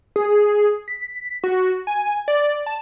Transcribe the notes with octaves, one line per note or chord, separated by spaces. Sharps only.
G#4
B6
F#4
G#5
D5
A5